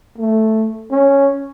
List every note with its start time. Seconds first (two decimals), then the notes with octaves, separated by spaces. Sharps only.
0.18 A3
0.91 C#4